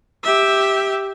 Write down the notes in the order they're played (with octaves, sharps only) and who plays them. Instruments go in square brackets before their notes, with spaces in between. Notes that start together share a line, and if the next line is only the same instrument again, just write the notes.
[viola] G4 E5